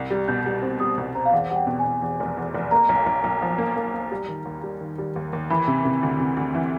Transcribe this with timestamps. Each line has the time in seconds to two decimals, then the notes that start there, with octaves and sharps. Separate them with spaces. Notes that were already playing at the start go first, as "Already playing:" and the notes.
Already playing: C2
0.10 G3
0.28 B2 G6
0.46 G3
0.62 C4
0.80 G3 D#6
0.97 C2
1.15 C4 A#5
1.25 F5
1.32 E2 F#5
1.50 G3 F#5
1.56 G5
1.67 B2
1.79 G#5
1.85 B2
2.02 E2
2.20 F1
2.37 E2
2.54 F1
2.71 A#3 A#5
2.89 B1
3.06 B1
3.24 B1
3.42 F3
3.58 A#3
3.76 A#3
3.94 A#3
4.11 G3
4.29 D#3
4.45 D#2
4.63 G3
4.81 D#3
4.98 G3
5.16 D#2
5.33 D#2
5.50 E3 B5
5.68 C3
5.85 C3
6.03 D2
6.20 C3
6.37 D2
6.55 E3